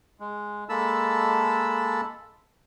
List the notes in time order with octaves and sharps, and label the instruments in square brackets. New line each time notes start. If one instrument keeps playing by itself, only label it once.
[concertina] G#3
G#3 A#3 A4 A5 B5 E6